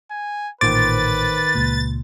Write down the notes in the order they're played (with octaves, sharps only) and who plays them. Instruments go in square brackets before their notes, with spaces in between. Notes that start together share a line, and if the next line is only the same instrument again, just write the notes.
[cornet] G#5
[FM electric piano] A1 A#2 C5 [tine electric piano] D#3 D6 [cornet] B4 [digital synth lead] A6
[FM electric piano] C#2 A#2